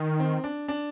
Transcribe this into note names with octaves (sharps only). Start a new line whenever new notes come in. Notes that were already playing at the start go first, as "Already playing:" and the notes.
Already playing: D#3
C4
D4
D4